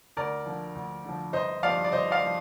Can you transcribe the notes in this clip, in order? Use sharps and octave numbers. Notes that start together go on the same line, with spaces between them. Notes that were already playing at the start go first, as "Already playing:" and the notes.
D2 A#4 D5
D3 F3
D2
D3 F3
G1 C5 D#5
G2 F3 D5 F5
D5
G1 C5 D#5
D5 F5
F3